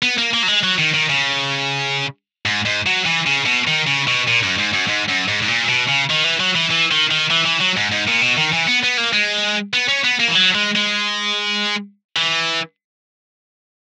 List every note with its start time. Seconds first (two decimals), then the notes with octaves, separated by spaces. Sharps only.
0.03 B3
0.18 A#3
0.34 A#3
0.43 F#3
0.48 G#3
0.63 F#3
0.79 D#3
0.94 D#3
1.10 C#3
2.45 G#2
2.65 G#2
2.86 F#3
3.06 E3
3.27 C#3
3.46 B2
3.67 D#3
3.87 C#3
4.07 B2
4.28 A#2
4.43 F#2
4.58 G#2
4.74 F#2
4.88 G#2
5.09 F#2
5.28 G#2
5.42 G#2
5.48 A#2
5.69 B2
5.89 C#3
6.10 D#3
6.24 E3
6.40 F#3
6.55 E3
6.70 E3
6.91 D#3
7.11 D#3
7.30 E3
7.46 E3
7.61 F#3
7.77 G#2
7.92 G#2
8.07 A#2
8.21 B2
8.37 D#3
8.52 E3
8.67 B3
8.83 B3
8.97 A#3
9.13 G#3
9.74 B3
9.89 C#4
10.04 B3
10.20 A#3
10.28 E3
10.35 F#3
10.55 G#3
10.76 G#3
12.16 E3